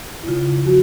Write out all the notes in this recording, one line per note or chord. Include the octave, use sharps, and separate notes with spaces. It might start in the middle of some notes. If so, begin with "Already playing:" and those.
E4
C#3 F4
F3 F#4